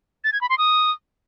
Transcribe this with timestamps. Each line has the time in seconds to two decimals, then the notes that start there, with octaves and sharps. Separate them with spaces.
0.24 A6
0.33 G#6
0.41 B5
0.50 C6
0.58 D#6